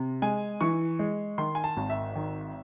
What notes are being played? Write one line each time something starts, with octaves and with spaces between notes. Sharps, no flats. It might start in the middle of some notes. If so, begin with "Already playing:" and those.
Already playing: C3
G#3 G#5
E3 C#6
G#3
D#3 C6
G#5
A5
G#1
E5
D#3